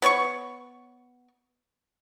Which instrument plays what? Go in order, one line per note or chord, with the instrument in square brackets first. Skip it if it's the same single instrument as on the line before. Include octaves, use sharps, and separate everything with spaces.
[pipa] B3 C#5 F#5 C#6